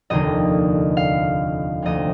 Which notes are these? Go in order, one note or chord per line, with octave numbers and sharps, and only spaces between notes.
F1 D#2 D3 D#5
F5
D2 C3 F3 D#5